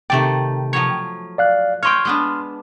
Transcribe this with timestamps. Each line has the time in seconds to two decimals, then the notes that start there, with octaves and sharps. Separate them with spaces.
0.10 C3 D#3 A3 D5 G5
0.73 F3 F#3 C#5
1.38 D5 F5 F#6
1.83 C#5 D#5 G5 C6 F6
2.05 G#3 B3 D4